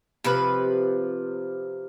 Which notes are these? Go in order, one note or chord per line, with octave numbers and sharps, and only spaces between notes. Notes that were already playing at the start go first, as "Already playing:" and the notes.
C3 F3 B4